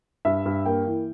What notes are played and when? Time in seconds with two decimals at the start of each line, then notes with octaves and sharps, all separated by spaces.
0.25 G2 E5
0.45 G2
0.65 A#3 G5
0.87 E3